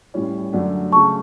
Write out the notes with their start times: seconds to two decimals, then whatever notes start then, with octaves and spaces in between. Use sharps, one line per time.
0.14 A2 G3 C#4 E4
0.53 F#2 D3 F#3 A3 D4
0.92 C#3 F#3 A3 A5 C#6